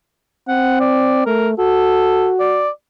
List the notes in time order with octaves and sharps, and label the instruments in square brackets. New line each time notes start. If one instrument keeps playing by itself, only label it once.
[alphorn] C4 [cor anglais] F#5
[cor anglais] D5
[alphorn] A3 [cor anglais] A#4
[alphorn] F#4 [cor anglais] A4
[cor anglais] D5